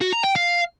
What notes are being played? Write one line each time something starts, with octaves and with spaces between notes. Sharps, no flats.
F#4
A#5
G5
F5